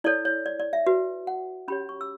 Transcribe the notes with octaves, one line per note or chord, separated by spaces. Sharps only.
E4 A4 C#5 D5
C#5
D5
D5
E5
F#4 B4
F#5
C#4 G4 C#5 B5
C#6
E6